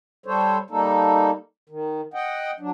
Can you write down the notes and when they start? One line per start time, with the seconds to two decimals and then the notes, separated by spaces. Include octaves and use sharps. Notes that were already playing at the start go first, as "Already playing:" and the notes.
0.26 G3 A4 C5 C#5
0.70 G3 A#3 D#4 A4
1.69 D#3
2.14 D#5 F#5 G5
2.60 F#3 D4